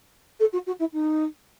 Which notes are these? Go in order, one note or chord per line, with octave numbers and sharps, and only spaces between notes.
A4
F#4
F#4
E4
D#4